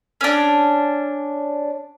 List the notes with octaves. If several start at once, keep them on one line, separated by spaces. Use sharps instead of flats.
C#4 D4